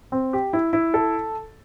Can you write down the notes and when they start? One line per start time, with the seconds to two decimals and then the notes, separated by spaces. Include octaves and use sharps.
0.12 C4
0.33 G4
0.53 E4
0.73 E4
0.94 A4